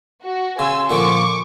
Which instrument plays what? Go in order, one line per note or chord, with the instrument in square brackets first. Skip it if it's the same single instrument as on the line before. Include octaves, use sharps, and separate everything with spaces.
[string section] F#4
[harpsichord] C#3 [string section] G#5 E6 [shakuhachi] C6
[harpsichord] A#2 D3 F3 [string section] C#6 D6